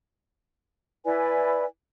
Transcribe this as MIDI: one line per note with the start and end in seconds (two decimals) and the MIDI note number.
1.05 1.65 64
1.05 1.65 71
1.05 1.65 74
1.05 1.65 80